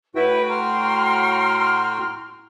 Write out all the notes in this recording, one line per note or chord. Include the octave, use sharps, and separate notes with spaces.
A2 E4 F#4 B4 G5
A#5 C6 F6